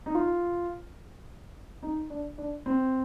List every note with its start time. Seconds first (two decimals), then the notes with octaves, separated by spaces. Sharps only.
0.06 D#4
0.15 F4
1.83 D#4
2.10 D4
2.38 D4
2.66 C4